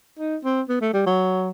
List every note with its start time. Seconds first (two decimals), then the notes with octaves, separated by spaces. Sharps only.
0.19 D#4
0.44 C4
0.69 B3
0.81 A3
0.93 G3
1.06 F#3